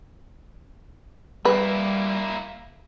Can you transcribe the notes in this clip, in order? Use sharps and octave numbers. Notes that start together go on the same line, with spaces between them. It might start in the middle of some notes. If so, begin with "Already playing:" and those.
G3 A#3 E4 B4